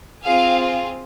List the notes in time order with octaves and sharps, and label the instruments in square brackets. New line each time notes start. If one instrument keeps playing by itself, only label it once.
[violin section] C4 F4 G#4 F5